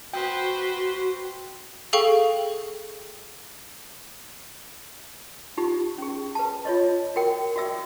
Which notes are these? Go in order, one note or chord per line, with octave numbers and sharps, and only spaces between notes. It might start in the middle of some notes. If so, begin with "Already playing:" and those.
F#4 B4 C5 G5
G#4 A4 F5 G5 C#6
D#4 F4 G4
C#4 G#4
B4 A5
F4 C#5 D#5
F#4 A#4 G5
F#4 D5 E5 E6